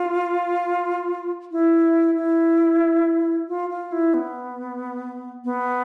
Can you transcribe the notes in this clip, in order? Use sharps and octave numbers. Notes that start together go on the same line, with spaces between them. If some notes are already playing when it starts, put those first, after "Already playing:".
Already playing: F4
E4
E4
F4
F4
E4
B3
B3